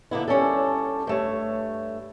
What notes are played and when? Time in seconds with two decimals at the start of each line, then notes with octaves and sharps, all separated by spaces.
0.11 D3 A#3 B3 E4
0.28 G3 C#4 D4 A4
1.07 G2 A3 C#5